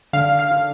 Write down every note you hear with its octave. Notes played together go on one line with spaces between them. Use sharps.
D3 F5
F5
D3